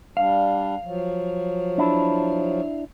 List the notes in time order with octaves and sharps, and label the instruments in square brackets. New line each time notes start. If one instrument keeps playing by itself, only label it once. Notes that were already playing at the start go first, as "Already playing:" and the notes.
[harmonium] G3 D4 [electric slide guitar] F5
[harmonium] F3 F#3
[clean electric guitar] D4 E4